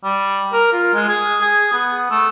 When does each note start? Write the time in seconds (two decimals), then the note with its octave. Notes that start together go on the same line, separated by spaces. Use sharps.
0.04 G3
0.52 A#4
0.72 F4
0.94 G#3
1.08 G#4
1.41 G#4
1.73 B3
2.11 A3